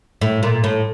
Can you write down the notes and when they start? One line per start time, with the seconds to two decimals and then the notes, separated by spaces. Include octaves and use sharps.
0.21 A2
0.43 A#2
0.64 A2